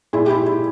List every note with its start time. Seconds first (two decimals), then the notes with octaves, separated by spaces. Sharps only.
0.13 A#2 G#3 E4 G#4
0.26 G4
0.29 E4 G#4
0.46 E4